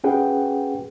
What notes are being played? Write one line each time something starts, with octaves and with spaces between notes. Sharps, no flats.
C#4 F#4 G#4 B4 F#5 G5